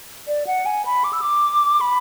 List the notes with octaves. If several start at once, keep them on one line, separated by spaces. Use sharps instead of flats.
D5
F#5
G#5
B5
D6
E6
D6
B5